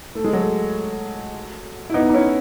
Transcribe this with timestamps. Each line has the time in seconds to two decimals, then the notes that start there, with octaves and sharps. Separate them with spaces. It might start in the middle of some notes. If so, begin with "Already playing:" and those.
0.15 A3
0.24 G#3
0.33 F#3 A3
1.90 E4
1.94 B3 D#4
2.09 D#4
2.13 C#4 E4